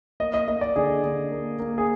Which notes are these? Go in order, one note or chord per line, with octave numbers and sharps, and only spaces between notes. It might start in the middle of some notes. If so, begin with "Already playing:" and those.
A#3 D#5
D#5
A#3 D#5
D5
D3 G#4
D3
A#3
A#3
G#4